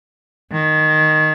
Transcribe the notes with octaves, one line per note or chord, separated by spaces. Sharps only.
D#3